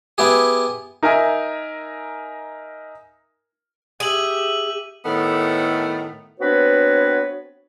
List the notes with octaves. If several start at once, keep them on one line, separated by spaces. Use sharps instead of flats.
B3 E4 G4 G#4
D#4 A#4 E5 G#5 A#5
G4 G#4 E5 D#7 F#7
A2 D#3 A3 B3 A4
B3 C4 D4 F#4 B4 C#5